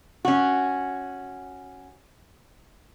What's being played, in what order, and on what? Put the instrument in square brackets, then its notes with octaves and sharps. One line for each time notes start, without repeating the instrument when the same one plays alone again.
[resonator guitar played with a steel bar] C#4 F#4